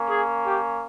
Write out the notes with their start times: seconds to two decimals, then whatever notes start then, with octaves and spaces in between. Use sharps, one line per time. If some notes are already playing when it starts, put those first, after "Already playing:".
Already playing: A#3 C#4
0.08 G#4
0.45 G4